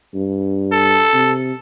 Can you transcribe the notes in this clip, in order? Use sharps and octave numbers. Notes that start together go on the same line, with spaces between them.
G2
A4
C3